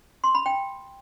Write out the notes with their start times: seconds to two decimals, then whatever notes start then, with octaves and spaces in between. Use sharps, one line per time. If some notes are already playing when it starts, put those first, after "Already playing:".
0.24 C6
0.35 B5
0.46 G5